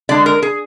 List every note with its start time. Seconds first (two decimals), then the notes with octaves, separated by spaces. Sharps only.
0.09 D3 G#3 D4 D5
0.26 A#4
0.42 G#4